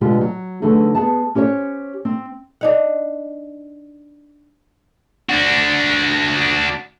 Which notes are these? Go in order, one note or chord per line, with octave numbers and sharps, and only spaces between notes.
B2 D3 G#3 B3 F4 G4
F#3
D3 E3 F#3 A3 D#4 G#4
B3 G#4 A5
C#4 G4 C5 C#5
C4
D4 D#4 F#5
D4 F#4